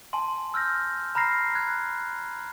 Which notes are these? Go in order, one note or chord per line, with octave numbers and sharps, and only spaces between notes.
G#5 A5 C6
E6 F6 G6 A#6
A#5 B5 F6 A#6 C7
F#6 G#6